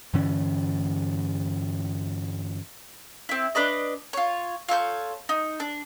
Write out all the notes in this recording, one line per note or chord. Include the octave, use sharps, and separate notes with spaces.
G2 D3 E3 C#4
C4 E4
D4 B4 D5 D#5
F4 C#5
F4 A4 C#5 G6
D#4
D4